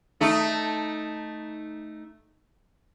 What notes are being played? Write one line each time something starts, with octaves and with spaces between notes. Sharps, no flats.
A3 D#4